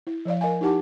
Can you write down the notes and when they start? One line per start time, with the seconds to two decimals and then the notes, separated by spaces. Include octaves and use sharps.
0.07 E4
0.25 F3 C#5 D5 F5
0.41 A#4 D#5 F5 G#5
0.61 D#4 E4 G4 F#5 A5 D6